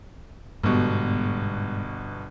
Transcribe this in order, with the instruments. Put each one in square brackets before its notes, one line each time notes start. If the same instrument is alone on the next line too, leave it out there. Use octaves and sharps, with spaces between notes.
[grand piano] G1 B2 [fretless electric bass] G#2 G3